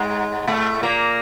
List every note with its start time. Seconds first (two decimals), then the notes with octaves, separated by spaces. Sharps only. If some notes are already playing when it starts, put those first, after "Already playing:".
Already playing: G#2 G#3
0.48 A2 A3
0.83 A#2 A#3